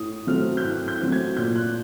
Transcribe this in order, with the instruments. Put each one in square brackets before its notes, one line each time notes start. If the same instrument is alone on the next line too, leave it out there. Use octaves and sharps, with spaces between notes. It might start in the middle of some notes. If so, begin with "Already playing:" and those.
Already playing: [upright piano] A2 D#6
F#3 A3 C4 F6
G6
A2 F#6
G6
F#3 A3 C4
G#6
A#2 G6
F#6